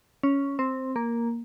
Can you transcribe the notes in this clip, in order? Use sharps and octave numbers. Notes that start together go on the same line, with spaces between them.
C#4
C4
A#3